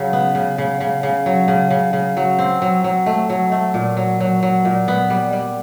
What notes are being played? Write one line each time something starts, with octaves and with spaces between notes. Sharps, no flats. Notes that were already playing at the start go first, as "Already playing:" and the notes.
Already playing: C#3 F#3
B3
C#3
C#3
C#3
C#3
F#3
C#3
C#3
C#3
F#3
C4
F#3
F#3
A3
F#3
A3
A#2
F#3
F#3
F#3
A#2
B3
G3
G3